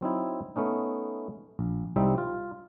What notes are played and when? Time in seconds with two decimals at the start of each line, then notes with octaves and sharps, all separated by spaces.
0.01 F#3 C4 D#4 E4
0.56 A3 B3 C#4 D#4
1.59 A#1
1.96 C2 G3 C4 D#4 E5
2.18 F4